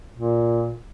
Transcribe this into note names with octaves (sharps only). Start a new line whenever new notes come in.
A#2